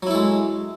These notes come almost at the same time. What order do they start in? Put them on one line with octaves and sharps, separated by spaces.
F#3 E4 A4 G#3